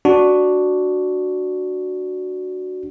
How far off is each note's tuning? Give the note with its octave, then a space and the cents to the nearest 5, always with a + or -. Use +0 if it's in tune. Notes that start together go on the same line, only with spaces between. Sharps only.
D4 +0 F#4 +0